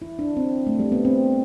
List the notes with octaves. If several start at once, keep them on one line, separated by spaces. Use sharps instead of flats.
E4
D4
C4
A3
G3
B3
C4